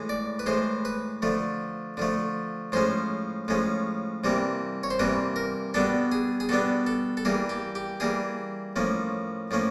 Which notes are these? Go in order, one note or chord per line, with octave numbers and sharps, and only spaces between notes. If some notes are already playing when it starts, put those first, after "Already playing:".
Already playing: A2 E3 G#3
D5
B4
A2 E3 G#3 C5
B4
D3 F3 A3
D3 F3 A3
A2 F3 G#3 C#4 C5
A2 F3 G#3 C#4
C3 E3 G3 A#3
C#5
C5
C3 E3 G3 A#3 B4
A#4
B2 G3 B3 D4 A4
G#4
G#4
B2 G3 B3 D4 A4
A4
A4
E3 G3 A#3 G#4
G4
G4
E3 G3 A#3 G#4
A2 F3 A#3 C#4
A2 F3 A#3 C#4